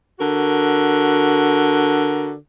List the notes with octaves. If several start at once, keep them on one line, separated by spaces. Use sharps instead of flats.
D3 F#4 A#4